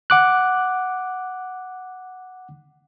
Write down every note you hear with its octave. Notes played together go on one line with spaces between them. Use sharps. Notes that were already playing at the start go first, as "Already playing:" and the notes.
F#5 D6 F#6